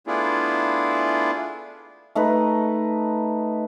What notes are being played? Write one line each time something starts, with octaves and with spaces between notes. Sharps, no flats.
A3 B3 D4 E4 F4 G#4
A3 D#4 B4